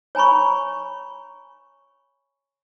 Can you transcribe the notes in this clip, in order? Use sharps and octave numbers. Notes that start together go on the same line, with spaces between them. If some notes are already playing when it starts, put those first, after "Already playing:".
C#5 G#5 A#5 B5 C#6